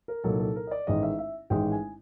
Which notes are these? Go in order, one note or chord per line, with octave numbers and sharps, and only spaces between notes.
A#4
C2 A#2 F#3 A#3 D#4 A4
A4
A#4
D#5
D5
A1 G#2 D#3 G#3 D#5
E5
E5
A1 G#2 D#3 G#3 G5
G#5